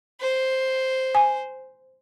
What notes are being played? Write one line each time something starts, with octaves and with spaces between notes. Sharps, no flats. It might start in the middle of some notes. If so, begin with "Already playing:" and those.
C5
G#5